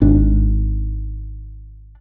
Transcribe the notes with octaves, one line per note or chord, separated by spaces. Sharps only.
G#1 D4